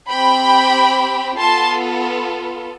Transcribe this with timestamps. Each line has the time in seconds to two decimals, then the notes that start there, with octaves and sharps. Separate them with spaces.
0.10 C4 G4 G5 B5
1.39 B3 F4 A4 A5 C6